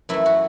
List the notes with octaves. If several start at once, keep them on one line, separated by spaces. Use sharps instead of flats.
F#2 E3 A3 E4
F#4